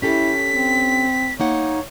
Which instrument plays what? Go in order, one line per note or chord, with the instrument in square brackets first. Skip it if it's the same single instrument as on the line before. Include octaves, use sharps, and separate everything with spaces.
[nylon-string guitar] C#4 G4 A4 [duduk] E4 [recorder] B6
[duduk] C4
[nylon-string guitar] A#3 D#4 F#5 [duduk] C#5